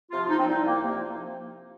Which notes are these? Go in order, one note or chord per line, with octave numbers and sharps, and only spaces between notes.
C3 F3 F4
F4
D#4
C4
C2 D#4
A#3
C3 F3 A#3